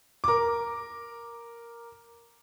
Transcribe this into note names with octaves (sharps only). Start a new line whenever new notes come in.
A#4 D6